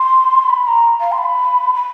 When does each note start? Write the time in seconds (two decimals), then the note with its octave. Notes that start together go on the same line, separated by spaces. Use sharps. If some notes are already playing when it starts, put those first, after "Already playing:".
Already playing: C6
0.50 B5
0.67 A#5
1.00 F5
1.12 C6
1.18 B5
1.74 B5